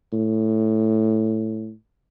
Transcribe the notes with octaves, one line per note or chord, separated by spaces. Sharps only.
A2